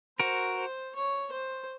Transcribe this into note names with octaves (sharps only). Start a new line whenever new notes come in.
F#4 A#4 C5
C5
C#5
C5